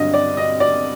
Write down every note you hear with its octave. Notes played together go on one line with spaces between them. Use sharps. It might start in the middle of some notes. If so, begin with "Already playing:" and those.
Already playing: G2 D3 F#3 D#5
D5
D#5
D5